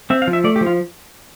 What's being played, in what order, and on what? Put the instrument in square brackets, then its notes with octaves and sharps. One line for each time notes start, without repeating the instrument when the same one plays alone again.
[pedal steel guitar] C4 E5
F5
F3
E5
A3 D5
G4
F3
F4